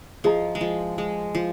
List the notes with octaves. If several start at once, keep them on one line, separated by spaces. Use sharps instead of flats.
F3 G#4 D#5 A#5
G#3
F3
G#3
F3